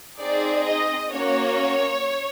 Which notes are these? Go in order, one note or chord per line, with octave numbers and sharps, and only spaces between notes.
C4 D#4 G#4 D5
D#5
A#3 C#4 F#4 C#5